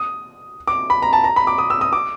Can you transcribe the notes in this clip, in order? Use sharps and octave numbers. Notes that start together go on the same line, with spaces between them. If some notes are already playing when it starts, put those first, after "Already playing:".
Already playing: D#6
D6
B5
A#5
A5
A#5
B5
D6
D#6
E6
D#6
D6